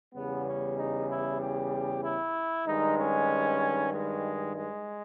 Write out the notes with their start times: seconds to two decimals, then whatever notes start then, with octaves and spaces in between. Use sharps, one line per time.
0.15 E2 C#3 G3 B3
0.46 C#4
0.77 D#4
1.09 E4
1.41 G4
2.03 E4
2.66 G2 D#3 G#3 D#4
2.98 C#4
3.92 G#3
4.56 G#3